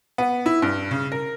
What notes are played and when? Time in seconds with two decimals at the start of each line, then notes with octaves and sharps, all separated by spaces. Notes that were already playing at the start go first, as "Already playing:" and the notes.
0.18 B3
0.46 E4
0.62 G2
0.91 C#3
1.12 A#4